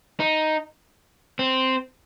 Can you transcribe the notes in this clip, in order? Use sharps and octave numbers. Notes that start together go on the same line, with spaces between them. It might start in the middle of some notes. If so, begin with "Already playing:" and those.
D#4
C4